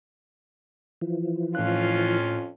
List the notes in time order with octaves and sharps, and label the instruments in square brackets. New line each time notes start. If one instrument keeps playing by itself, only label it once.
[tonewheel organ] E3 F3
[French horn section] F2 C#4 F4 [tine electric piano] A2 F#6